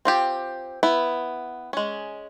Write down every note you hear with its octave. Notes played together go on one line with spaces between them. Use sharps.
C4 F4 G4
B3 E4
G#3 C#4